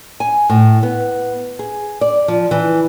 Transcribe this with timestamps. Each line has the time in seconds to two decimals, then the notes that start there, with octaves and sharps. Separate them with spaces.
0.20 G#5
0.49 A2
0.83 B3
1.59 G#4
2.01 D5
2.28 F3
2.51 E3